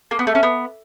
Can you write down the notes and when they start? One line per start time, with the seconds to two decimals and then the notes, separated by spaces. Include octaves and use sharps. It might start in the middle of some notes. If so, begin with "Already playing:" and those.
0.11 A#3
0.19 B3
0.27 A3
0.35 C#4
0.43 B3